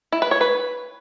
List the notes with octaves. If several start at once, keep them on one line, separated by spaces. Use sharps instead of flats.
E4
B4
C#5
B4